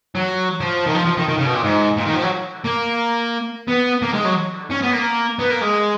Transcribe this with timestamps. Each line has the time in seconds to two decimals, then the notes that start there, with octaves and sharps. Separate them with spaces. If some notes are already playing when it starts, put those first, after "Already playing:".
0.15 F#3
0.60 F3
0.87 D#3
0.95 F3
1.06 F3
1.17 D#3
1.29 D#3
1.38 C#3
1.46 B2
1.54 A#2
1.63 G#2
1.97 A#2
2.06 D#3
2.14 F3
2.23 F#3
2.65 A#3
3.68 B3
4.02 A#3
4.13 G#3
4.25 F#3
4.70 C#4
4.82 B3
4.93 A#3
5.39 B3
5.50 A#3
5.61 G#3